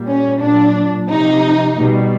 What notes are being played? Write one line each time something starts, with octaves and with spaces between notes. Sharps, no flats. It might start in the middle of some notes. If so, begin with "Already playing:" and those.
Already playing: A#2 G3
C#4
A#2 F#3 D4
C3 F3 D#4
B2 G3